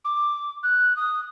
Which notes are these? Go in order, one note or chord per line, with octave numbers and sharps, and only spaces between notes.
D6
F#6
D#6